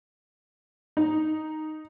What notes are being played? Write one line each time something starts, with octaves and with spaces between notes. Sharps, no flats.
D#4